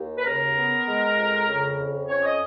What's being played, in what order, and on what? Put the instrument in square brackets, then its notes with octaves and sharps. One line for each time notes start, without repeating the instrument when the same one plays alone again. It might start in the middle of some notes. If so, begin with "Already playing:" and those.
Already playing: [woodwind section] D#2
B4
C#3 A#4
B3
G#3
F2
C#3
F2
C#4 C#5
D#5